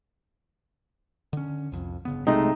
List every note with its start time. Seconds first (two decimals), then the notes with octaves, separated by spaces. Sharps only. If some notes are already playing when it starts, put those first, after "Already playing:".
1.33 D3 C#4
1.72 C2 F2
2.05 G1 C#3 B3
2.27 B1 C3 G#3 A3 D#4